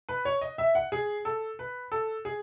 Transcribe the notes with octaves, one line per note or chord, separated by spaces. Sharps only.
B4
C#5
D#5
E5
F#5
G#4
A4
B4
A4
G#4